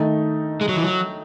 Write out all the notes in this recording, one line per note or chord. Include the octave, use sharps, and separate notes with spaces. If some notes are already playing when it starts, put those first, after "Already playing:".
Already playing: D#3 A3 D#4
G#3
F#3
E3
F#3